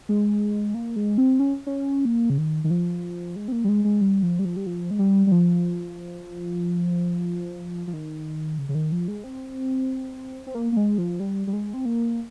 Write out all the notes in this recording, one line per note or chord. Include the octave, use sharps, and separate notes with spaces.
G#3
A#3
G#3
C4
C#4
C#4
A#3
C#3
D#3
D#3
F3
G#3
C4
A#3
G3
G#3
G#3
G3
F3
G3
F3
G3
F3
G#3
G3
G3
F3
F3
D#3
C#3
C#3
D#3
F3
G#3
C4
C4
A#3
A#3
G#3
F3
G3
G3
G#3
C4
A#3